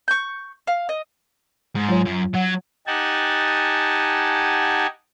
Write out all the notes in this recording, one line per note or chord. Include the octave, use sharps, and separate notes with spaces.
C#6 G6
F5
D#5
G#2
F#3 F4 C#5
F#2
F#3 F#5
D#4 G4 F#5 G#5 A5